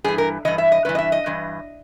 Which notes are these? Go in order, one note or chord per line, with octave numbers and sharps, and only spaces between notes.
G2 E3 G#4
A#4
G2 E3 D#5
E5
D#5
G2 E3 B4
D#5
E5
D#5
G2 E3